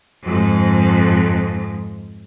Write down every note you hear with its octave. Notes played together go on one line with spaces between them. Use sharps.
F2 G#2